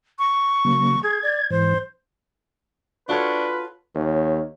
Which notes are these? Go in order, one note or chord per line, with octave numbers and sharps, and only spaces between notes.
C#6
C#3 F#3 A#3
G#4 G#6
D5
G#2 E3 C5
D4 F4 F#4 A4 B4 C#5
D#2 C#5